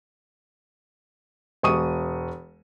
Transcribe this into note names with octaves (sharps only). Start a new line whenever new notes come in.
E1 C#6 D#6 D#7